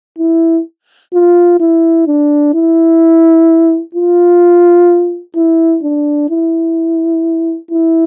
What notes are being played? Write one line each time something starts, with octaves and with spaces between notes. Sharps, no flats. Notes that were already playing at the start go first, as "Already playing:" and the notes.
E4
F4
E4
D4
E4
F4
E4
D4
E4
E4